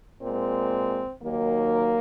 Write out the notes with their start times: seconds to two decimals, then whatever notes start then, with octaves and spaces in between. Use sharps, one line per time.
0.22 A#2 G#3 C4
1.22 D#2 D#3 F#3 A#3